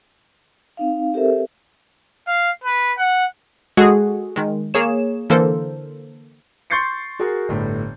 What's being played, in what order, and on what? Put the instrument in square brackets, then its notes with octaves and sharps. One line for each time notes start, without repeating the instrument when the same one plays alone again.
[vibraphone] C4 D#4 F5
C4 G4 A4 A#4 C5 E5
[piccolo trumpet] F5
B4
F#5
[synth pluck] G#3 F#4 G#4 A4 F#5
D#3 G#3
A#3 G#4 C#5 E7
D3 E3 A#3 A4 A#4 C5
[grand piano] C6 C#6 G6 A6 C7 C#7
F#4 G#4 A#4
G1 A2